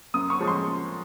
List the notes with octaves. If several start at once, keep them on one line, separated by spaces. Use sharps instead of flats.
F#2 D#6
C#6
F3 G#3 C#4
C6